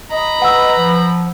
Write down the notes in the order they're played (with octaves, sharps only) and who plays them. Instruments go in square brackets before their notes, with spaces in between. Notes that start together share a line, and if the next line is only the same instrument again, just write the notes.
[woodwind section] D#5 [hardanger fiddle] A#5 B5
[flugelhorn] B4 [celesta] F#5 E6
[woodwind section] F3